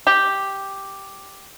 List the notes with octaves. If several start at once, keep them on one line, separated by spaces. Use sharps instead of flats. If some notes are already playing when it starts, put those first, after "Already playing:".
G4